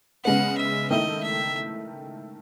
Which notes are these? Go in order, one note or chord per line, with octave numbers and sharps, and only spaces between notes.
C#3 G#3 B3 F#5
E5
D#3 A3 E4 D#5
E5